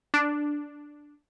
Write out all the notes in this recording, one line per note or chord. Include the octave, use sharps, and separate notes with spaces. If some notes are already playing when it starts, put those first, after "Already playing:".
D4